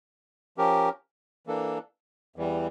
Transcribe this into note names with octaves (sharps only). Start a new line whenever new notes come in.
F3 C#4 G4 A#4
E3 A#3 D4 A4
E2 E3 G3